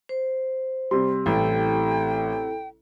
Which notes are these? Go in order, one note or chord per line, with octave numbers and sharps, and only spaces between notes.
C5
C3 G3 C6
A1 E4 A4 G5